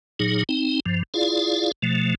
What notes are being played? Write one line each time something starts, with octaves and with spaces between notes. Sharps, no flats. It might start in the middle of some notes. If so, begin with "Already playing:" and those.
A#2 F#3 D#4 G#4
C4 D#4
G2 F3
E4 F4 G#4 D5 F5
B2 F3 A3